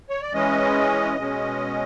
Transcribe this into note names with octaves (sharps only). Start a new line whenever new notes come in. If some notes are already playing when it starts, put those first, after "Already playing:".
C#5
D5
E3 G#3 C#4 D#5
B2 G#3 C#4